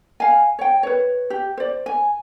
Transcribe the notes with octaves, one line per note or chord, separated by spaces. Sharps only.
F5 G#5
C#5 G5
B4 C#5
G4
C5 D5
G#5